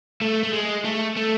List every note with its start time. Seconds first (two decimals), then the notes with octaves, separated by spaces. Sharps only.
0.22 A3
0.43 A3
0.53 G#3
0.84 A3
1.16 A3